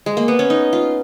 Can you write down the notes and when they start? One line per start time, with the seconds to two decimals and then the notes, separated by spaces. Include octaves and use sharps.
0.06 G#3
0.17 A#3
0.28 B3
0.39 C#4
0.50 D#4
0.73 F4